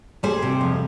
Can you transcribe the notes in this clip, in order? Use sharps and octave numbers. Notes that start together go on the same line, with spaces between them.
G3 G#4 C5
C3
F2